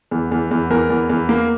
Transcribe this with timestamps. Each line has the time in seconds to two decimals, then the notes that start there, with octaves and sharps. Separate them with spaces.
0.11 E2
0.31 E2
0.51 E2
0.70 E2 A#4
0.90 E2
1.09 E2
1.29 A#3